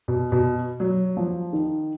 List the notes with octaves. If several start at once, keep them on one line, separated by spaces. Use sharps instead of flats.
B2
B2
F#3
F3
D#3